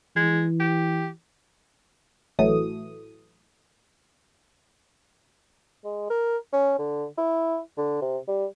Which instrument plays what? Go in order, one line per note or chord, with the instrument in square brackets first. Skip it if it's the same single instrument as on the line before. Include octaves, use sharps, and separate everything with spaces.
[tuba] E3 [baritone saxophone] G#3
[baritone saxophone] G4
[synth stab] A1 E3 F#3 A3 D#6
[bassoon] G#3
A#4
C#4
D3
E4
D3
C3
G3